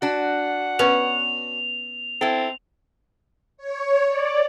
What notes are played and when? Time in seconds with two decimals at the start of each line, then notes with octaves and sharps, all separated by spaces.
0.02 D4 F#4 F#5
0.79 B3 C#4 F7
2.21 C4 E4 A4
3.57 C#5
4.08 D5